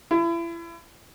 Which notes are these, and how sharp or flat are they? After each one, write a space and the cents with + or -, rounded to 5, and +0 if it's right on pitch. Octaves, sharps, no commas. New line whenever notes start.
E4 +35